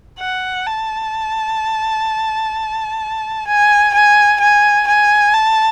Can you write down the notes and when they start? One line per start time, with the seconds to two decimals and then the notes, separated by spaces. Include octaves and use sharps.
0.20 F#5
0.67 A5
3.47 G#5
3.94 G#5
4.40 G#5
4.88 G#5
5.34 A5